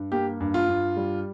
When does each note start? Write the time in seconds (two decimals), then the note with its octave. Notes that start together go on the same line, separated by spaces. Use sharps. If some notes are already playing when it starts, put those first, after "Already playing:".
Already playing: G2
0.12 A#3 G4
0.40 G2
0.54 F4
0.68 G2
0.96 G3